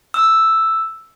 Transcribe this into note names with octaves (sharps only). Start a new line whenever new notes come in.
E6